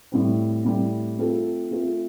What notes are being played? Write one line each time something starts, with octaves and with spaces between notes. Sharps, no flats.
A2 G3 C4
A2 G3 C4
A3 C4 F4 A4
A3 C4 F4 A4